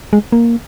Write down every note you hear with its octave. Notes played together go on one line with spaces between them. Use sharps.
G#3
A#3